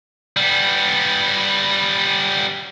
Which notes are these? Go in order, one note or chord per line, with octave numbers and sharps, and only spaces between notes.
G3 B3